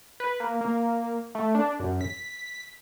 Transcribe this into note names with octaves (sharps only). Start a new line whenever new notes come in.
B4
A#3
A#3
A3
D4
F#2
B6